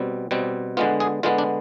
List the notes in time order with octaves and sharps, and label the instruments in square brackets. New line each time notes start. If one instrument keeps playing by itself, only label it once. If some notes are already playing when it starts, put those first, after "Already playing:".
Already playing: [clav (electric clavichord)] B2 G3 C4
B2 G3 C4
D3 G#3 B3 F4
G#4
D3 G#3 B3 F4
D4